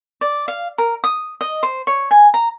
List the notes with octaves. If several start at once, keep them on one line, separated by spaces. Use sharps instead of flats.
D5
F5
A#4
D#6
D#5
C5
C#5
G#5
A#5